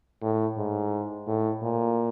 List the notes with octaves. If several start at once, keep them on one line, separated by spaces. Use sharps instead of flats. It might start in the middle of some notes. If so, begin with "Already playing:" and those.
A2
G#2
A2
A#2